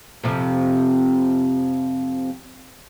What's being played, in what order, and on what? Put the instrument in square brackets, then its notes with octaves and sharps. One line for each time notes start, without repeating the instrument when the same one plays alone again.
[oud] F2 C3 F3